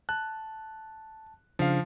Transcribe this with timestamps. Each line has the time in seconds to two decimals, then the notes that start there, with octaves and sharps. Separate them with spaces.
0.09 A5 F#6
1.59 C#3 F3 D4 F5